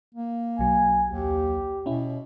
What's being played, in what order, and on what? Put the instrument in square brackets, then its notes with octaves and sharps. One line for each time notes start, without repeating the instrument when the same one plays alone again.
[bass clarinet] A#3
[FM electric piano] B1 F#3 [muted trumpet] G#5
[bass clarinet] D#2 [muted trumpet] G4
[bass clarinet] B2 [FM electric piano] C#4 E4